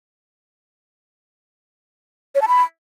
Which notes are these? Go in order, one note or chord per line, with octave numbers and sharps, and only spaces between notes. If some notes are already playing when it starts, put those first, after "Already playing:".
C#5
A5
B5